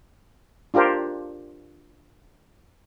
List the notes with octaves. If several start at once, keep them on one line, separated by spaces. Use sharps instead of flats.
D4 F4 G4 A#4 C5